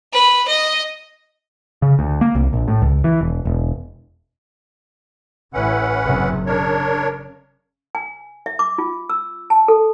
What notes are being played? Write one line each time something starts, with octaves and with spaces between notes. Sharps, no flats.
B4
D#5
C#3
D2
A#3
C2
A#1
A2
C#2
E3
E1
E1
A1 C#4 E4 B4 F#5
F#1 C3
C#3 D4 A#4 C#5
G#5
E5
D6
F4
E6
A5
A4